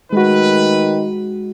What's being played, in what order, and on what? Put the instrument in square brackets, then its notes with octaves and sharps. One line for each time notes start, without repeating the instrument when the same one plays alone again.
[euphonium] D#3 [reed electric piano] G#3 F#4 [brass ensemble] A3 B4